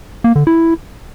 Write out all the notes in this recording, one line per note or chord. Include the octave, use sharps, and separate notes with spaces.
A#3
D3
E4